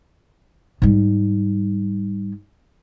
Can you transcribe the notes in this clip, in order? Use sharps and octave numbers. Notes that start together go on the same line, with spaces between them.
G#2 G3